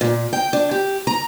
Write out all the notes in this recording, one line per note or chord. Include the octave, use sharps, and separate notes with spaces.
A#2
G5
D4
G4
A#5